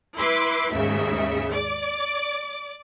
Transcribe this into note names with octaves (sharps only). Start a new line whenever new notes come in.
E4 B4 C6 D6
D#2 G#2 C#3 E5
D5 D6